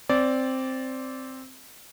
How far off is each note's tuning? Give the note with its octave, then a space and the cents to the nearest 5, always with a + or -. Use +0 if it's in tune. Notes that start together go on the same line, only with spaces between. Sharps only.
C4 +0 D5 -15